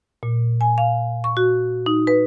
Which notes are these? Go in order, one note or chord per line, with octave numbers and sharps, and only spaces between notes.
A#2
G#5
F5
C#6
F#4
D#4
B4